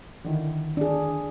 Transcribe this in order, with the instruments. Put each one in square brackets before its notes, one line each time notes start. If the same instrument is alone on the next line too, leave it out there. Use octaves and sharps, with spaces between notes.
[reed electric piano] D3 D#3 E4
[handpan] D4 G#4